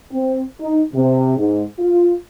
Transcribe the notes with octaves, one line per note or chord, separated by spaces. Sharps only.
C4
D#4
C3
G#2
F4